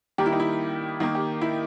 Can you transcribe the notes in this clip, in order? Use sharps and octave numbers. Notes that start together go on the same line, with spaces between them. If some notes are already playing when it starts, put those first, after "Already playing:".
D#3 G3 A#3 G4
E4
D#4
E4
D#3 A#3 D#4
G4
E4